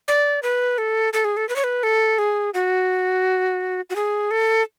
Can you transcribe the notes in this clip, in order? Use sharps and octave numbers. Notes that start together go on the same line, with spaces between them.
D5
B4
A4
A4
G#4
A4
B4
C#5
B4
A4
G#4
F#4
F#4
G#4
A4